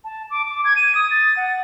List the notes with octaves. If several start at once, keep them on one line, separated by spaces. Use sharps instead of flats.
A5
D6
D6
G#6
D#7
D#6
A6
F#5